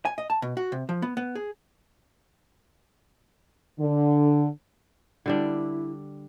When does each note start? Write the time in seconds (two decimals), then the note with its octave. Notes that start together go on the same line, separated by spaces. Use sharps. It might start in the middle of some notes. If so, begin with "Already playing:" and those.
0.05 G#5
0.18 D#5
0.30 A5
0.42 B2
0.57 F#4
0.72 C3
0.89 F3
1.02 B3
1.17 B3
1.35 G#4
3.80 D3
5.26 D3 G3 D4 E4